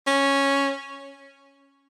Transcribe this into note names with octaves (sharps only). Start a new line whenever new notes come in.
C#4